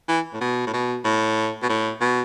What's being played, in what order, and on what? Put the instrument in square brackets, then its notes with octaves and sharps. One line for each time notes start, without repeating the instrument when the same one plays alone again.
[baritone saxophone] E3
A2
B2
A2
B2
A2
B2
A2
B2